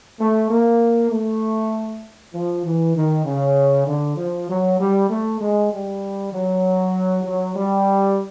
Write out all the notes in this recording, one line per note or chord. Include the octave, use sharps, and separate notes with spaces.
A3
A#3
A3
F3
E3
D#3
C#3
D3
F3
F#3
G3
A3
G#3
G3
F#3
F#3
G3